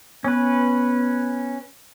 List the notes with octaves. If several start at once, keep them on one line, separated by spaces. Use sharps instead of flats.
B3 C#4 B4